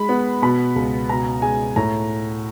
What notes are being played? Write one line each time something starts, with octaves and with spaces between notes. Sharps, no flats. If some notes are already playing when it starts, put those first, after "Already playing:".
Already playing: G#3 B5
B3
B2 B5
C#2
B2 A#5
G#3 G#5
A2 A#5